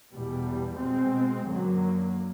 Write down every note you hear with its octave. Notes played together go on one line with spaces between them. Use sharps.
E2 B2 G3
B2 G#3 C4
F#2 D3 F#3 A#3